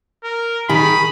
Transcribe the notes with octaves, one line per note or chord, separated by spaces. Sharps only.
A#4
D#3 G#4 B5